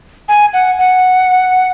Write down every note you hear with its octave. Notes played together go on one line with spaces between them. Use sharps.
G#5
F#5
F#5